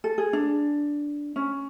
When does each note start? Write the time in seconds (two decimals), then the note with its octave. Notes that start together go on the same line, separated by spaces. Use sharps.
0.04 A4
0.18 G#4
0.33 D4
1.36 C#4